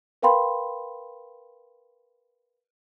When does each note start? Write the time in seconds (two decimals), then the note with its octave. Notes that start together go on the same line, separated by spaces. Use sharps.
0.22 A#4 B4 F5 G5 B5 C6